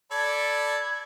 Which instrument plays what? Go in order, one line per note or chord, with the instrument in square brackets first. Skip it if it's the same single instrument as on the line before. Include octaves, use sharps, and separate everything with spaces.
[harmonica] A4 D5 B5 [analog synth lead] G#6